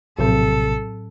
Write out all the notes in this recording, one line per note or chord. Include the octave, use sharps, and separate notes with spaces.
A#1 A2 C3 F#3 C4 A4